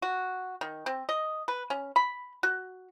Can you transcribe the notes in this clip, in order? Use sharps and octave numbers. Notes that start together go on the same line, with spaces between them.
F#4
D#3
C4
D#5
B4
C#4
B5
F#4